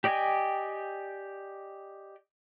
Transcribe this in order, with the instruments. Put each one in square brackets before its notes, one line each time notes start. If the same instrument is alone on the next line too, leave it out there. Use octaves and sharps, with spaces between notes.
[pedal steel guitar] G4 D5 D#5 G5 G#5